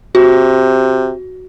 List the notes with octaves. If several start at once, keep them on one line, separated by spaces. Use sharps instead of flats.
C3 F#4